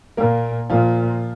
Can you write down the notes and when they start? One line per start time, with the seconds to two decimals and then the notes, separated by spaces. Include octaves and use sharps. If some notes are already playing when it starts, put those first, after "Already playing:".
0.17 A#2 A#3 A#4
0.70 A#2 F3 F4